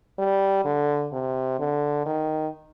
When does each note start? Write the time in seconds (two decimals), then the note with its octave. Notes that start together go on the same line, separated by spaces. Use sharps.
0.19 G3
0.65 D3
1.12 C3
1.59 D3
2.06 D#3